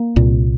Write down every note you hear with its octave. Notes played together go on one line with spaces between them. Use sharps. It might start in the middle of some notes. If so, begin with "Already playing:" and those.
Already playing: A#3
C2 A#2